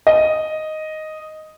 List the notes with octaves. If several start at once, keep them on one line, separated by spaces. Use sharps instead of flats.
D#5